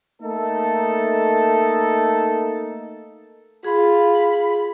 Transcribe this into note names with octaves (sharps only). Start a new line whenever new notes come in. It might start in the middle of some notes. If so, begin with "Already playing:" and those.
A3 A#3 D#4 A4
F4 G#4 B5